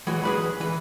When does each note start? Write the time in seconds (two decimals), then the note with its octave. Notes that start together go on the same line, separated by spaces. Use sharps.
0.07 E3 F#3 G#3
0.24 G#4 B4 B5
0.60 E3 B4